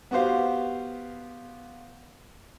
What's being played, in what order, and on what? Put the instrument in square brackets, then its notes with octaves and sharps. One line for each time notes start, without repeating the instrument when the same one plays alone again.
[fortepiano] B3 F#4 G4 C5 F5